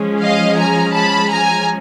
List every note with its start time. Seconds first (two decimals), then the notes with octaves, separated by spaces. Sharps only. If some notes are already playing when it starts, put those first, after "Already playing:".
Already playing: F3 G#3 C#4
0.21 D#5 F5
0.58 G#5 A#5
0.94 A5 B5
1.31 G#5 A#5